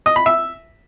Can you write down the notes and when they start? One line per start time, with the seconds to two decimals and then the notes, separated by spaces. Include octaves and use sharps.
0.06 D#5
0.16 B5
0.26 E5